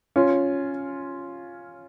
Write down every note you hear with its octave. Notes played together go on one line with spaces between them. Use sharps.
C#4 F4